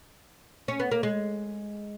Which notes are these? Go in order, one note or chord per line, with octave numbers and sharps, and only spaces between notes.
C#4
B3
A#3
G#3